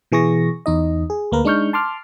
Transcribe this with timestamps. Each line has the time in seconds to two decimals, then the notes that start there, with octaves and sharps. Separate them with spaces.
0.12 B2 E3 G#4 C#6 A#6
0.66 E2 D#4 D#5
1.10 G#4
1.32 D2 A#3 A#4 B4
1.44 G#3 D4 D#4 C#6 F6 G6
1.73 A5 C6 D6 F6